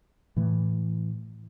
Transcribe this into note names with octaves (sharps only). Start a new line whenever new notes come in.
A2 E3 A3